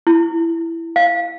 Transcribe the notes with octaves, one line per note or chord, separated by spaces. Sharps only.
E4
F5